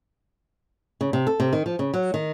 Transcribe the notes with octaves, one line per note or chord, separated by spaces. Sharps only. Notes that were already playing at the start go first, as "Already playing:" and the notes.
C#3
C3
A4
C3
D#3
F3
C#3
F#3
D#3